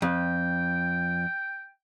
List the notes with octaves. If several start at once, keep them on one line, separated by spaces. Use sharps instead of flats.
F2 G5